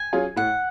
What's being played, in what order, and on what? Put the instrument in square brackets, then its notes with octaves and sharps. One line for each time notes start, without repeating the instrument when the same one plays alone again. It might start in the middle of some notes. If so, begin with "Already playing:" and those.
Already playing: [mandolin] G#5
[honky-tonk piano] F#3 C#4 F4 G#4
[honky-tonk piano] A2 [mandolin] F#5